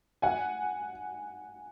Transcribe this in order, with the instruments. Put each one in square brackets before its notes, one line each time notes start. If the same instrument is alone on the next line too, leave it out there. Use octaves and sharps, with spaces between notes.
[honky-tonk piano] F#5 G#5